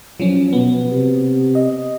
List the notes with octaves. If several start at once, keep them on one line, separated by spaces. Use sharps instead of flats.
F3 F#3 C#4
B2 B3
C3
D#5